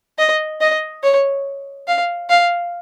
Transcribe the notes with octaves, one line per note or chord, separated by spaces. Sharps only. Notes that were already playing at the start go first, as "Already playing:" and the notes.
D#5
D#5
C#5
F5
F5